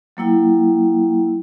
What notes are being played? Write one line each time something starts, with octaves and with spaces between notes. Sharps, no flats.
F#3 A#3 E4 G5